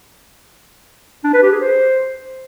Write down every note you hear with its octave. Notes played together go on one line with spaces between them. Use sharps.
D4
B4
G4
G#4
C5